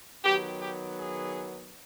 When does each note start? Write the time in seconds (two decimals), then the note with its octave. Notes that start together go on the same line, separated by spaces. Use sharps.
0.24 D#3 F#3 B3 G4
0.61 G4
0.98 G#4